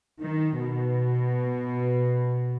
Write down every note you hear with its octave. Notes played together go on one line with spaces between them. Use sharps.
D#3
B2